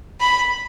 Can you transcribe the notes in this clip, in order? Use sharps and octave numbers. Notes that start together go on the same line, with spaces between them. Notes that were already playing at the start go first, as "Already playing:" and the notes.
B5